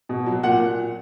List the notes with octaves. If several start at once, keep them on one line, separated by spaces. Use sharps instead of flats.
B2
F#3
A#2 F#5